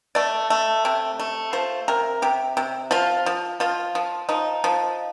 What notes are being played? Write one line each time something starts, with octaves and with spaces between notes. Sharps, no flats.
A3 D5
A3
C3
A3
F3 C5
C3 A#4
C3 G4
C3
F3 F4
F3
F3 F4
F3
F3 D#4
F3